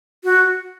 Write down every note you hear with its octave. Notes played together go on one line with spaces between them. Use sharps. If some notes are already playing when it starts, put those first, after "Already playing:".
F#4